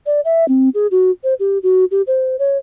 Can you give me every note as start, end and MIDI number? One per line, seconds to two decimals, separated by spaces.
0.06 0.21 74
0.25 0.47 76
0.48 0.69 60
0.75 0.87 68
0.91 1.11 66
1.24 1.34 72
1.40 1.58 67
1.63 1.85 66
1.91 2.02 67
2.07 2.36 72
2.39 2.57 73